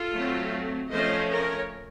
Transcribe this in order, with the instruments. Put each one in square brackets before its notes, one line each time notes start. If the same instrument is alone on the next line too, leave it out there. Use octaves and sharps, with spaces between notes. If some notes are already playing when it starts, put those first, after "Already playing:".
Already playing: [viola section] F4 A4
F#3 A3 C4
F3 A3 C#4 C5 D#5
A#4 C#5